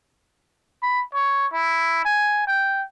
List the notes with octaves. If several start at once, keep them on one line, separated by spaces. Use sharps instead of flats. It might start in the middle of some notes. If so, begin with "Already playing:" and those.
B5
C#5
E4
G#5
G5